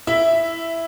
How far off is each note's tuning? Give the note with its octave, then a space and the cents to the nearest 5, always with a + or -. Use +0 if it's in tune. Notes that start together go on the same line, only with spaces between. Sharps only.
E4 +5 E5 +0